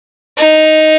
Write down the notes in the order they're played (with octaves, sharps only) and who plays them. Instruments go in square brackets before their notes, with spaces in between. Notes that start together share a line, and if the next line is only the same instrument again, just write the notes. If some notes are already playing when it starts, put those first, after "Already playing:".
[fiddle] D#4